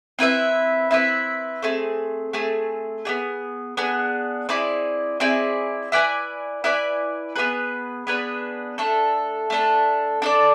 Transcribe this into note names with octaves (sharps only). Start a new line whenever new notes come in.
C4 E4 B4 E5
C4 E4 B4 E5
A3 C4 G#4
A3 C4 G#4
B3 D4 G#4
B3 D4 G#4
C4 E4 G#4 D5
C4 E4 G#4 D5
E4 B4 D5 G#5
E4 B4 D5 G#5
B3 D4 G#4 B4
B3 D4 G#4 B4
A3 D4 A4
A3 D4 A4
D4 A4 D5